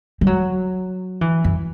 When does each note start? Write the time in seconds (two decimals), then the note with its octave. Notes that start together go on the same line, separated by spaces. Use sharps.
0.21 G3
0.27 F#3
1.21 E3
1.44 F#2